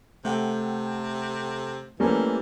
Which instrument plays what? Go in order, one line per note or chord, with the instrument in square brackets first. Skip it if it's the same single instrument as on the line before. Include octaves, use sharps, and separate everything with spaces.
[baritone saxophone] C3 [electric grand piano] A3 F#5 G5
[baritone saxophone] E3 [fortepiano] G3 A#3 C#4 [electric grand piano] A3 G4 C5